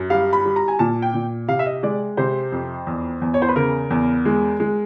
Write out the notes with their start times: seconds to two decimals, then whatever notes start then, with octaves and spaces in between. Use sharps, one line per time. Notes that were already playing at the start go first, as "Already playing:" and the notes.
Already playing: F#2
0.10 G3 F5
0.33 B5
0.45 G3
0.56 A#5
0.68 G#5
0.79 A#2 A5
1.02 G5
1.14 A#2
1.48 C3 F5
1.59 E5
1.66 D#5
1.83 G#3 D5
2.17 C3 C5
2.52 F2
2.87 E2
3.21 E2
3.34 C#5
3.42 C5
3.48 B4
3.55 C#3 A#4
3.90 E2
4.25 G#3
4.60 G#3